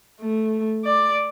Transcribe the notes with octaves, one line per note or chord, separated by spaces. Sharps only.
A3
D5